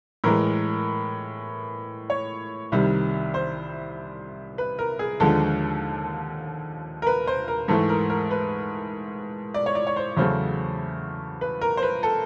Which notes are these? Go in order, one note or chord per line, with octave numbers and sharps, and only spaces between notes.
A2 E3 G#3 A#4
C#5
C2 C3 D#3 G3
C5
B4
A#4
G#4
D#2 D3 F3 G#3 A4
A#4
B4
C5
A#4
G#2 E3 A3 A4
A#4
A#4
B4
D5
C#5
D5
C#5
C5
E2 C#3 F#3 A3 C5
B4
A#4
C5
B4
A4